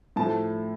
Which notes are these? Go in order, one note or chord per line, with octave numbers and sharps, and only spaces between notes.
A2 F3 A3 A5